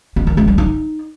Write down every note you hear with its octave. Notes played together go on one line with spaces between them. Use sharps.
B3
D#3
A3
G3
D#4